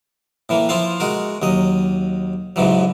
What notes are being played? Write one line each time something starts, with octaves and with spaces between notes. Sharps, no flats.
A2 E3 A#3
F3 E4 F4 F5
G#3 F#4 A#4
D#2 F#3 D#5
A1 G#2 C#3 E3 F#3